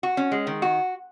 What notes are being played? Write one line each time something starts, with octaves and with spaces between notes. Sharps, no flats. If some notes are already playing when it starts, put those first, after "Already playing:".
F#4
C#4
G#3
D#3
F#4